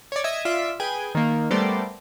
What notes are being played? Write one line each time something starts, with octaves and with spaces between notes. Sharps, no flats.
C#5 D5
D#5 E5 G#6
F4 D5 E5
G#4 B4 G5 G#5
D#3 A#3
G3 A3 B3 A#4 C5 D5